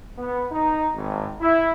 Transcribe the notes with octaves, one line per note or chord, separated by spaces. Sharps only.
B3
D#4
G#1
E4